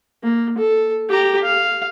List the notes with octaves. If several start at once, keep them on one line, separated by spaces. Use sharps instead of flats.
A#3
A4
G4 A#5
F5